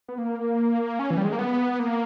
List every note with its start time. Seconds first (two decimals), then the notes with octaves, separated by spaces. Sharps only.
0.08 B3
0.18 A#3
0.99 C#4
1.11 E3
1.18 G3
1.25 G#3
1.32 A#3
1.39 B3
1.79 A#3